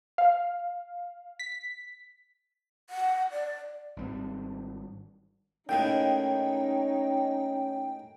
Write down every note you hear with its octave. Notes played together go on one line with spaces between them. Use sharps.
F5
B6
F#5
D5
G#1 G3 C4
D#2 A2 D#3 C#4 D#4 G5